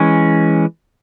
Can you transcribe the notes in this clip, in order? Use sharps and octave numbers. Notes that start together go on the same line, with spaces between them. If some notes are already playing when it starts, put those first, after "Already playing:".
Already playing: E3 G#3 C#4